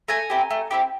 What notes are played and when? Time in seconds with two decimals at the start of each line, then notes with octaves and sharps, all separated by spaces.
0.08 A3 G#5 A#5
0.30 C4 E4 G4
0.51 A3
0.71 C4 E4 G4